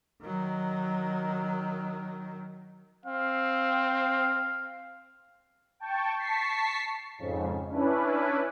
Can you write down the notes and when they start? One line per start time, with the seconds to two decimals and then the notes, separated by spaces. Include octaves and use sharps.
0.23 D#3 F#3
3.06 C4 F5
5.80 G5 A5 C#6
6.18 A5 C#6 B6 C7
7.19 F2 G#2 C#3
7.69 C#4 D4 E4 B4